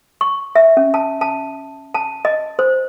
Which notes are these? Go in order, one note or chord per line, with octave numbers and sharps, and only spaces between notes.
C#6
E5
C#4
A5
A5
A5
D#5
C5